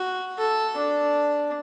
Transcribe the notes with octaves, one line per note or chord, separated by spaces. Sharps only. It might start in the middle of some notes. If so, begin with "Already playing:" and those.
Already playing: F#4
A4
D4